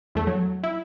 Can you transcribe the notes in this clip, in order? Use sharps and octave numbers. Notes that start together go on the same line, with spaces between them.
E2 A3
F#3
E4